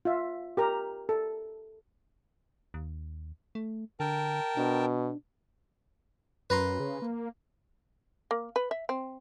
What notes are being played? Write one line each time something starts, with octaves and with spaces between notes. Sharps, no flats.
F4 E5
G4 A#4 A#5
A4
D#2
A3
D3 A#4 G5 A5
B2 D4
F#2 B4 A#5 C6
C#3
A#3
A#3
B4
E5
C4